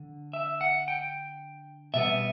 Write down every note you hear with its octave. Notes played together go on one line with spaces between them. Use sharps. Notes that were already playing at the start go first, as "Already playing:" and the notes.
Already playing: D3
E5
F#5
G5
B2 G3 B3 E5